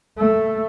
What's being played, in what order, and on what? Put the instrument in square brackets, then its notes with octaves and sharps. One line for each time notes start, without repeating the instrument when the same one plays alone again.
[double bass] A3